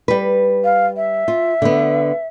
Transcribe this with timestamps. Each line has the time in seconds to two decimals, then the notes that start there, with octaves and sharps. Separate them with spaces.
0.08 G3 B4
0.64 F5
0.97 E5
1.28 F4
1.62 D3 B3